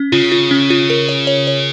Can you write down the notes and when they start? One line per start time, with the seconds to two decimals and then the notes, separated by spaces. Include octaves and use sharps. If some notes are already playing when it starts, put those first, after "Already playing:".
Already playing: C#4
0.12 C#3 F4
0.32 F4
0.51 C#4
0.70 F4
0.90 A#4
1.09 C#5
1.27 C#5
1.47 C#5